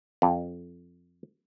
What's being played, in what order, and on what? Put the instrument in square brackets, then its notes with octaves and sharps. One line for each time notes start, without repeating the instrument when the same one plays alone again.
[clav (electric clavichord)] F2